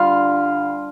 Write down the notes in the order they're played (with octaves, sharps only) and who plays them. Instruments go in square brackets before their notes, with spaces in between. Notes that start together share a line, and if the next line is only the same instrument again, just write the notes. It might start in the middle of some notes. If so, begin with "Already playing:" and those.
Already playing: [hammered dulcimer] D3 G3 F4 F5